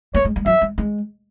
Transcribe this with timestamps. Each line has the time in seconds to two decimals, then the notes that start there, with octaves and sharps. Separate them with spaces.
0.14 A#3 C#5
0.25 G#3
0.36 G#3
0.46 F#3 E5
0.61 G#3
0.78 G#3